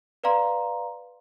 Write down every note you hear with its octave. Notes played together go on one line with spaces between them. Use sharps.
B4 D5 F5 A#5 C6